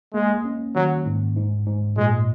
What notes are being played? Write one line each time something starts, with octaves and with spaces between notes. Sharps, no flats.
G#3 A#3
C#4
D#3 F#3
G#2
G#2
G#2
A#2 G#3